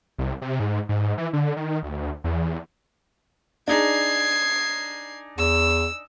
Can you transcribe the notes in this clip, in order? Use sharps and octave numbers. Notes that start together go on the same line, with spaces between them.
C2
C3
G#2
G#2
E3
D3
D#3
D2
E2
D4 D#4 G#4 G#6 C7
E2 E6